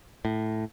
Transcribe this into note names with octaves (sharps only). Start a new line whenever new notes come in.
A2